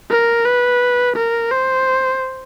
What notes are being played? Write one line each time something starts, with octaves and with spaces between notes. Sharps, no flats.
A#4
B4
A#4
C5